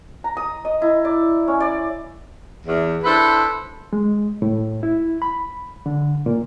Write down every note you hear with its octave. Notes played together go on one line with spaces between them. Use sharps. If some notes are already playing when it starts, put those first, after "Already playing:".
A#5
D#6
D#5
E4
D5
C#4
D5
E2
D4 E4 A4 B4 C5
G#3
A2
E4
B5
D3
A#2